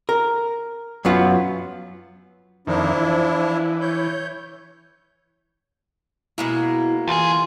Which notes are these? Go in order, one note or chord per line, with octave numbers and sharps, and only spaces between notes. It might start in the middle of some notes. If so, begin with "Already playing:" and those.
A#4
F#2 F#3 B3 F4
F2 D#3 F3 D4 E4
E3
C#5 G6
B2 G#3 A#3 E4
D2 E3 F4 G#4